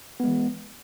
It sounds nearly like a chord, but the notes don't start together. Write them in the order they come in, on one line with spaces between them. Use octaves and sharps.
B3 G#3 E3